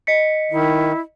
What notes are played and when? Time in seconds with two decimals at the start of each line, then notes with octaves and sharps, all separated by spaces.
0.07 D#5 B6 C#7
0.52 D#3 E4